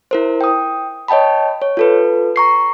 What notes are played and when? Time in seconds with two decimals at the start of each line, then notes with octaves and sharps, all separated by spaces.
0.11 E4 A#4 C5
0.41 G5 D#6
1.08 C#5 D#5 G5 A5 B5
1.62 C#5
1.77 F4 A4 B4
2.36 A#5 C#6 C7